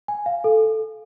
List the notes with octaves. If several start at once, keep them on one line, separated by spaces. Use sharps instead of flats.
G#5
F5
A4